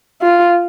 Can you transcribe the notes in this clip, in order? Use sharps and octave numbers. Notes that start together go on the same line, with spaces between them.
F4